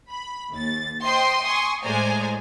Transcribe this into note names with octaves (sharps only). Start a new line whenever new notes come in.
B5
D#2 A6
C5 D#5 G5 C6
G#5 C6 C#6 D#6
A2 G#3 C5 D5 G#5 A#5